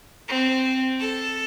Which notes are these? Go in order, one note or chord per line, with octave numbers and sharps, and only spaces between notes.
C4
A4